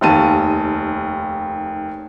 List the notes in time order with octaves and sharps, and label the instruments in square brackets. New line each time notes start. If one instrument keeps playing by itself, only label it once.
[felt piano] F1 D#2 A5 D#7